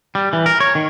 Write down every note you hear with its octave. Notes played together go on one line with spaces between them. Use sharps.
G3
E3
A#4
C#5
D#3